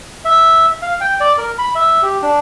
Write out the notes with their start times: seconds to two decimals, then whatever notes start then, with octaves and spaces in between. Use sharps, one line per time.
0.25 E5
0.82 F5
1.01 G5
1.20 D5
1.38 A#4
1.58 B5
1.75 E5
2.02 G4
2.22 D4